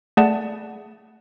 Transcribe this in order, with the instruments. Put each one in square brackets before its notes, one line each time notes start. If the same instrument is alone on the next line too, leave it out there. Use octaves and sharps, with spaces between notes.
[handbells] A3 G#4 D5 F#5 A5